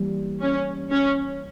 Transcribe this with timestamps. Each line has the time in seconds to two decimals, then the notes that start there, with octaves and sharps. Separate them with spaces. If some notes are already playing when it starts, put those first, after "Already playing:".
Already playing: E3 G3 A#3
0.40 C#4
0.91 C#4